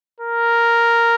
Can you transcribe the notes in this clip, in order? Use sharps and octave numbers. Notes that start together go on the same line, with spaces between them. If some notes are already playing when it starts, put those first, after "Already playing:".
A#4